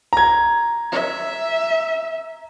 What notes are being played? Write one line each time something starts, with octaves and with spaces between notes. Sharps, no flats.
A#5 G#6
E5